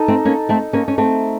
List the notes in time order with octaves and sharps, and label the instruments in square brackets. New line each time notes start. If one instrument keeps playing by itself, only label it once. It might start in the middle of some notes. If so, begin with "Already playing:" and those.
Already playing: [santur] D#4 A4 D#5
[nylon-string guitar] A3 C4
A#3 C#4
A3 C4
A#3 C#4
C#4
A3 C4